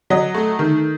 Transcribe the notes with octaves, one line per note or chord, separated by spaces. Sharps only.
F#3 D#5
A3
D#3